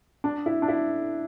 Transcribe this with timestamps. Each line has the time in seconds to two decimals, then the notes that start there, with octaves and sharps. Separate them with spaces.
0.24 D4
0.46 E4
0.62 D4
0.68 E4